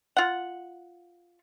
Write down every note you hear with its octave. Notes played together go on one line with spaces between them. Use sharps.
F4 F#5